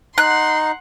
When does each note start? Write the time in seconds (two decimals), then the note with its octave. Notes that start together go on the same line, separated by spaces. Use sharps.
0.18 D#4 F#5 C6 F#6